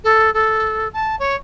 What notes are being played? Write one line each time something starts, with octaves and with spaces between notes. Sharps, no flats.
A4
A4
A5
C#5